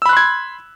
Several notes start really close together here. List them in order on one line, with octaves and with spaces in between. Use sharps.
E6 B5 F#6 C6 G#6